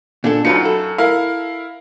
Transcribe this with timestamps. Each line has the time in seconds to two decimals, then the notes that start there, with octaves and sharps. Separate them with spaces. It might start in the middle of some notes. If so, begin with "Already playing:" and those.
0.24 A#2 D4 A4
0.45 F#2 F#3 D#4 F4 B4 C#7
0.65 A4
0.98 E4 A#4 F5